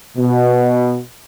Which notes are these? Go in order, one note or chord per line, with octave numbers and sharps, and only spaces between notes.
B2